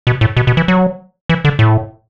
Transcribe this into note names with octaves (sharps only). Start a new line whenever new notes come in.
B2
A2
B2
B2
E3
F#3
E3
D3
A2